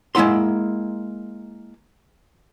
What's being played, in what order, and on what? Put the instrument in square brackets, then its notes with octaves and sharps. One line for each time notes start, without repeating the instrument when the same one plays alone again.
[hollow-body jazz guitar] G#3 A#3 E4 F#5 C6